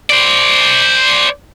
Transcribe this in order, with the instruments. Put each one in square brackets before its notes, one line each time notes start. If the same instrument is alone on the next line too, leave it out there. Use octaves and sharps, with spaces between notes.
[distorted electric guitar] C5 D5